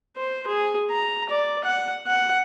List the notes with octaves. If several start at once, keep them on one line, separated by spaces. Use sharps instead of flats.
C5
G#4
A#5
D5
F#5
F#5